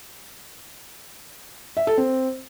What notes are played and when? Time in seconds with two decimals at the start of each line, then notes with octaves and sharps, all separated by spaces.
1.77 E5
1.87 A4
1.98 C4